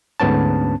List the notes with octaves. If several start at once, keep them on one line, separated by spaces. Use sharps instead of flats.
D2 G#2 B3 C#4 A5